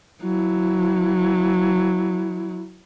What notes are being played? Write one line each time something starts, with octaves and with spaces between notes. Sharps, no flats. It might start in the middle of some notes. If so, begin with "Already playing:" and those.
F#3 E4